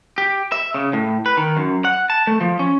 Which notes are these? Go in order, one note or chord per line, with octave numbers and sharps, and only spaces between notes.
G4
E5
C#3
A2
B4
D#3
F#2
F#5
A5
A3
F3
C#4